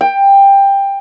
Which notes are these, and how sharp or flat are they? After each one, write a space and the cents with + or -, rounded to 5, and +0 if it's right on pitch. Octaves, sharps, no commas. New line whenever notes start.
G5 +15